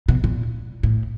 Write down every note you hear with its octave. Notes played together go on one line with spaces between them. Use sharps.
B2
A#2
A2